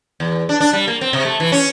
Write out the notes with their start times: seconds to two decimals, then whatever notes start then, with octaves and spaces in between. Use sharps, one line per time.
0.20 E2
0.49 D4
0.60 D4
0.73 G3
0.88 A#3
1.01 C4
1.13 C3
1.25 A3
1.40 E3
1.52 C#4